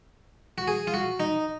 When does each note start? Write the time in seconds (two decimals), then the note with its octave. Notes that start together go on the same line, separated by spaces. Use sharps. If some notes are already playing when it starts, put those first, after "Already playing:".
0.58 F#4
0.68 G#4
0.87 F4
0.94 F#4
1.20 D#4